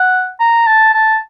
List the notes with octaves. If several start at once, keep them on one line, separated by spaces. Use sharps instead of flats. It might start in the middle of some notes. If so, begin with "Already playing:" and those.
Already playing: F#5
A#5
A5
A5